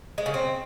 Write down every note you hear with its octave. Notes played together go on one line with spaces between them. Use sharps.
G#3
C#3
C4